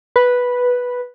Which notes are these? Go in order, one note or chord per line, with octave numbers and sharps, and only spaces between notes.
B4